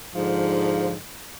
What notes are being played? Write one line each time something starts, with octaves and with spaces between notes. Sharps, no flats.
G#2 D3 F3